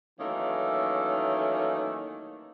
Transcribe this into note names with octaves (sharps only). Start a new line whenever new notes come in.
D#3 E3 F#3 A3 A#3 C#4